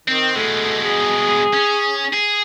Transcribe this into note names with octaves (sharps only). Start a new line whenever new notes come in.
D#3 C4
B2 G#3 A3
G#4
C#4
G#4